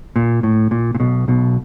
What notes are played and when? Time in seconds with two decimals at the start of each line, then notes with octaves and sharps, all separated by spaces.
0.16 A#2
0.43 A2
0.71 A#2
0.95 A#2
1.00 B1 B2
1.28 B1 B2